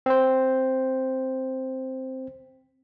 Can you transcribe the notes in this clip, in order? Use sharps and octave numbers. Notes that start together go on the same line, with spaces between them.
C4 C5